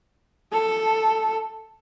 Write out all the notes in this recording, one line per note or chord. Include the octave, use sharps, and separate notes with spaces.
A4